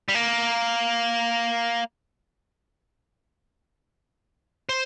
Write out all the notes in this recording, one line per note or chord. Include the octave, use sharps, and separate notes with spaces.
G3
A#3
C5